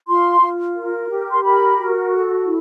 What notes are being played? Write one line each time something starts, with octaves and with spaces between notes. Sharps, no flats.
F4 C6
F4
A#4
G4
C6
A#4 B5
F#4
A4
E4